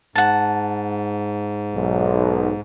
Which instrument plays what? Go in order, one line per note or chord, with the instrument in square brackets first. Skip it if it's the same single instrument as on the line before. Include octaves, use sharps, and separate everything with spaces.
[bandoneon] G#2 [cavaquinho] F#5 A5
[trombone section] B1